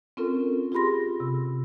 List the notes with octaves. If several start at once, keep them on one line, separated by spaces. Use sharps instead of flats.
C4 C#4 F4 A4 A#4
F4 G4 G#4 B5 C6 A#6
C3